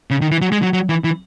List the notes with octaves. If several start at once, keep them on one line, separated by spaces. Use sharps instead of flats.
C#3
D#3
E3
F#3
G#3
F#3
F#3
E3
E3